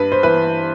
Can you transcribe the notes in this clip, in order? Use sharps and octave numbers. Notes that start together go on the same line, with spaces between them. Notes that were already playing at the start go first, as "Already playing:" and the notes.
Already playing: G2 B4
C5
E3 B4